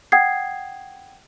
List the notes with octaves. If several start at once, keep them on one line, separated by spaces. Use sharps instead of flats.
F#5 G5 D#6 G#6 C7